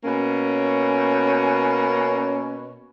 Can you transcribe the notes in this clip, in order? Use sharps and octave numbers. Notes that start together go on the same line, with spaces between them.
B2 A#3 C#4